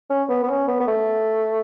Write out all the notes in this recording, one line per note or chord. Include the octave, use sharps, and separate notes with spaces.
C#4
B3
B3
C#4
B3
B3
A3